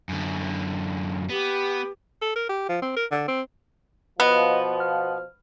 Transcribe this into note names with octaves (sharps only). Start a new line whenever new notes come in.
F#2 D3
B3 G4
A4
A#4
G4
F3
C4
A#4
D3
C4
B2 F3 B3 B4 D#5
F6